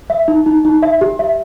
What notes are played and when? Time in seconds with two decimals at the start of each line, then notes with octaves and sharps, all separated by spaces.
0.10 E5
0.28 D#4
0.46 D#4
0.65 D#4
0.82 E5
1.01 G4
1.19 E5